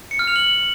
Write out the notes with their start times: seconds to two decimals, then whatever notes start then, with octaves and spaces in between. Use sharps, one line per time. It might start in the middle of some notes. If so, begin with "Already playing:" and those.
0.11 C#7
0.19 F6
0.28 F7
0.36 F#7